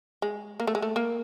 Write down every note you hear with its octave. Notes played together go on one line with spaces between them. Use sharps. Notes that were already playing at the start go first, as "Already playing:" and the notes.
G#3
A#3
A3
G#3
A3
A#3